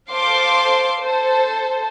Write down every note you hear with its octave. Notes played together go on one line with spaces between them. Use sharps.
A4 C5 F5 C6 D6
A4 C5